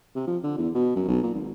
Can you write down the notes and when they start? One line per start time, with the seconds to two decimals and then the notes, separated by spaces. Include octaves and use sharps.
0.15 C3
0.27 F3
0.43 D3
0.58 E2
0.75 B2
0.96 F#2
1.08 B1
1.23 A#2
1.34 G#1